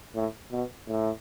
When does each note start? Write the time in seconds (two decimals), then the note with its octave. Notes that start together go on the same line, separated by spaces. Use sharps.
0.15 A2
0.52 B2
0.88 A2